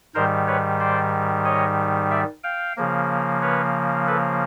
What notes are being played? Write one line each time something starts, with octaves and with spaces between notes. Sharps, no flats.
G#2 D#3 G3 A#4 C5
B4 C#5
C5 D5
C#5 D#5
D5 E5
F5 G5
C#3 F3 A#3
B4 C#5
A4 B4